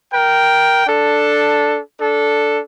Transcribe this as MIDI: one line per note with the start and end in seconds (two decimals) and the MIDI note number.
0.13 0.84 70
0.13 0.84 79
0.86 1.78 62
0.86 1.78 69
2.00 2.59 62
2.00 2.59 69